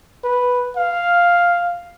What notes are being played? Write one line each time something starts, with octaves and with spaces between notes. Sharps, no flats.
B4
F5